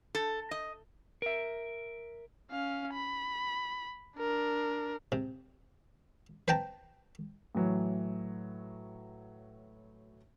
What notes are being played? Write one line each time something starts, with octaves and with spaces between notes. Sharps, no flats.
A4
D#5
A#4 E5
C#4 F5
B5
D4 A#4
C3
B4 C5 G5 A5 A#5
A2 E3 F#3